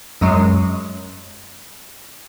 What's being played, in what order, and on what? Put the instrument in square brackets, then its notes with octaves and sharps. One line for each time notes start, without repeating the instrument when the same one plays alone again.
[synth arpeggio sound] F#2 F#3 G#3